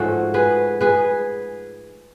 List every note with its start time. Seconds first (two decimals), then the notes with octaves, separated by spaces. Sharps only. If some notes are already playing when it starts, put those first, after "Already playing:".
Already playing: G#2 F3 A3 C#4 F#4 A4
0.34 G#4 B4
0.81 G#4 B4